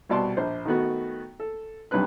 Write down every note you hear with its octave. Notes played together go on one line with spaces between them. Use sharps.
C2 B2 D5 A5 C6
A#1 C5
D#3 A3 B3 F#4
A4
B1 G2 C3 G3 B4 F#6